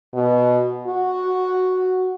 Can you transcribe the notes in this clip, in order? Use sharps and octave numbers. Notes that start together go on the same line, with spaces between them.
B2
F#4